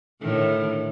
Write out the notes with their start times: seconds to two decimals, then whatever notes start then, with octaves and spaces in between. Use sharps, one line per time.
0.21 A2 D3 D#3